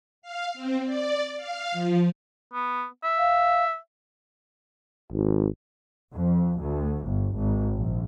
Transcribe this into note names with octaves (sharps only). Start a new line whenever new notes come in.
F5
C4
D5
F5
F3
B3
E5
F5
G#1
F2
D2
G1
G#1
A#1